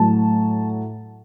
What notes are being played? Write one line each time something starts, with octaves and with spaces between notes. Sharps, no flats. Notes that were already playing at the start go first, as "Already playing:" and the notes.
Already playing: A2 F#3 A5